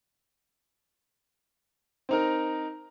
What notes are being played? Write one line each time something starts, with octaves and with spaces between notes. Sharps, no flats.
C4 D#4 A#4